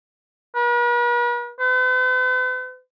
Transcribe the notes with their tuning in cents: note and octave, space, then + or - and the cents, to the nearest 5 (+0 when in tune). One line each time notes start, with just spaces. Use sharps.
B4 -45
B4 +45